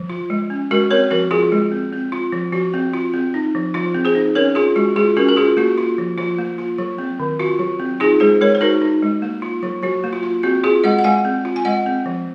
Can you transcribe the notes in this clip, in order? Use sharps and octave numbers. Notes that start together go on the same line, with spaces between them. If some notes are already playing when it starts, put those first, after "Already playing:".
Already playing: F3
F4
G#3
C#4
G#3 F#4 A#4
C4 A#4 C#5
F3 F#4 A#4
F3 F4 G#4
G#3
C4
C4
F4
F3
F3 F#4
C4
F4
C4
D#4
F3
F3 F4
C4
G#4 C5
D#4
C#4 A#4 C#5
F4 G#4
G#3 F#4
G#3 F4 G#4
C#4 F#4 A#4
A#4
F4 G#4
A#3 F#4
F4
F3
F3 F4
A#3
F4
F#3
C4
D#3
F4 F#4
F#3
C4
D#4 F4 G#4
G#3 G#4 C5
G#3 A#4 C#5
C5
D#4 F#4 A#4
D#4
G#3
A#3
F4
F#3
F#3 F#4
A#3
F4
F4
C4 F#4
F4 G#4
G#3 D#5 F#5
F#5
G#3 F5 G#5
C4
F4
G#5
G#3 D#5 F#5
C4
F3